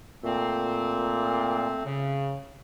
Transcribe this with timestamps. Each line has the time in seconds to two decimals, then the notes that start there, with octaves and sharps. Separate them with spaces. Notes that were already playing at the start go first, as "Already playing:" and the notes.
0.25 A#2 A3 C4
1.86 C#3